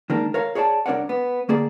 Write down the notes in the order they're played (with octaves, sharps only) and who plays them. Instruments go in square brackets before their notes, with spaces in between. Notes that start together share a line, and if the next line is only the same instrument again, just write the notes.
[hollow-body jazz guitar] D#3 G#3 A#3 D4
A#4 C#5 F5
G#4 C#5 D5 G5 A5
C2 D4 A#4 C#5 D5 F#5
B3
D3 A#3 G#4 D5